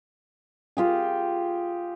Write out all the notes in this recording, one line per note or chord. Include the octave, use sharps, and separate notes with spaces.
F4 G4 G#4